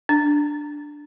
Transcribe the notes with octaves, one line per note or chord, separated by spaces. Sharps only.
D4